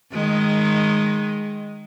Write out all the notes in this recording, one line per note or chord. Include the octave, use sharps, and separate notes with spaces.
D#3 G#3